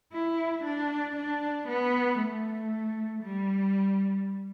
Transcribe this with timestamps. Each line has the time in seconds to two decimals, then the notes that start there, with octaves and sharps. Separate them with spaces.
0.13 E4
0.64 D4
1.16 D4
1.68 B3
2.19 A3
3.23 G3